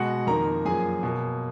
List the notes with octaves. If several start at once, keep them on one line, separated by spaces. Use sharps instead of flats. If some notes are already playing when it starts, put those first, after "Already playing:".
Already playing: B2 G#3 F#4 F#5
F2 D#3 A#3 A#4 A#5
F#2 F3 A#3 G#4 G#5
B2 A#3